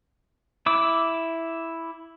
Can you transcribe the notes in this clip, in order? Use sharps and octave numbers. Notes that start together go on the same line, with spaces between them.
E4 D6 E6